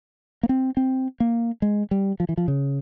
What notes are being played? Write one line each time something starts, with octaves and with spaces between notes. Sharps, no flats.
A#3
C4
C4
A#3
G#3
G3
F3
E3
F3
C#3